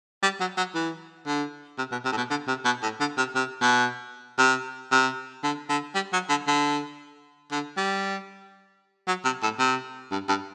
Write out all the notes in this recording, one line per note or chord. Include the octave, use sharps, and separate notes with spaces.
G3
F#3
F#3
E3
D3
C3
B2
C3
A2
B2
D3
C3
B2
A2
D3
C3
C3
B2
C3
C3
D3
D3
G3
F#3
D3
D3
D3
G3
F#3
C3
A2
C3
G2
G2